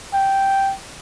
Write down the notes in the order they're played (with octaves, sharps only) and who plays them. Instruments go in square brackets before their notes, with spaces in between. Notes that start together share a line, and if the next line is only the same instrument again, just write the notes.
[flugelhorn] G5